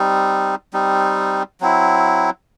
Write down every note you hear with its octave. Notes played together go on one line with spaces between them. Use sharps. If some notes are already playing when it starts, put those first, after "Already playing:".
Already playing: G3 C4 D#4
G3 C4 D#4
F#3 C4 E4